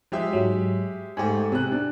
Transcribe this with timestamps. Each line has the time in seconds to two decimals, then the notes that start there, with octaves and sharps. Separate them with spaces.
0.12 F3 G#3 G4 E5
0.33 G#2 F#3
1.17 G#2 A3 G4 G#5
1.52 C3 F#6
1.72 D4